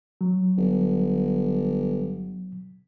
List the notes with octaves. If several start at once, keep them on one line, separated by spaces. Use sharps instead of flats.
F#3
G1